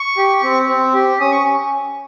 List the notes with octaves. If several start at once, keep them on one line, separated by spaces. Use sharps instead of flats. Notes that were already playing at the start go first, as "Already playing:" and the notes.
Already playing: C#6
G4
C4
C4
G4
C#4 D#6
C#6